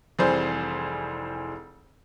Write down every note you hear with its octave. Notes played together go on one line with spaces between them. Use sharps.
F1 E3 G3 C4 G#4 C5